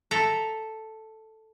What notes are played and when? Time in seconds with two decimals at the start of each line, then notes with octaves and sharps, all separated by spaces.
0.11 A4 E5 A#5